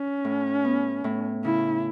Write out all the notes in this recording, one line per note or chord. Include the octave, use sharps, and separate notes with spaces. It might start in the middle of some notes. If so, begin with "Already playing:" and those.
Already playing: C#4
A2
B3
A2
C#3 E4